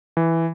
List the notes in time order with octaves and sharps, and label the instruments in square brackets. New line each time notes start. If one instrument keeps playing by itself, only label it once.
[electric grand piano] E3